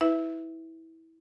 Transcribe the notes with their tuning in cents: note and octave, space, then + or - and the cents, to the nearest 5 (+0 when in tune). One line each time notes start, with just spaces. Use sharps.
E4 -20 B4 +15 E5 +0